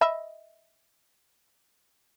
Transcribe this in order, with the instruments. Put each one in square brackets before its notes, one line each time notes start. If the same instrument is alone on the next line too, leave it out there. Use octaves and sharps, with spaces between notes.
[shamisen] D#5 E5 B5